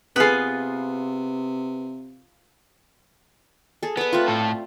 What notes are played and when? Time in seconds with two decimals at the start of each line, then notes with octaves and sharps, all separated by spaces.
0.16 C3 B3 F4 G#4 B4
3.83 G#4 A4
3.97 B3 B4 D5
4.13 A3 C4 F4
4.28 A2 A4